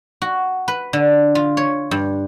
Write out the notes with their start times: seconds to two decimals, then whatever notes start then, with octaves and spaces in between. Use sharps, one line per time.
0.22 F#4
0.68 B4
0.93 D3
1.35 F4
1.57 C#5
1.91 G2